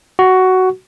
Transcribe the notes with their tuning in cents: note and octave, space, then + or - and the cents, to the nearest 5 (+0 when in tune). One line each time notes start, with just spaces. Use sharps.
F#4 +10